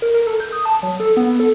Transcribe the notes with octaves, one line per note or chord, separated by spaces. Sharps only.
A#4
A#4
A4
G6
D#6
A5
F#3
A4
B3
A4